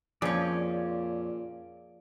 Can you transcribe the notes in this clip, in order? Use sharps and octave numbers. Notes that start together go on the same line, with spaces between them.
F2 A#2 F3 C#4 G#4 D5